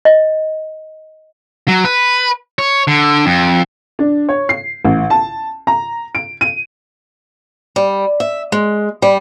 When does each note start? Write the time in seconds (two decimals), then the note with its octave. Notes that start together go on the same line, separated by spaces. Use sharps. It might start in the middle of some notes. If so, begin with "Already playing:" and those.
0.05 D#5
1.68 F#3
1.84 B4
2.59 C#5
2.87 D3
3.26 F2
3.99 D4
4.29 C#5
4.49 C7
4.85 A1
5.10 A5
5.67 A#5
6.15 D7
6.41 D#7
7.76 G3
8.20 E5
8.52 G#3
9.02 G3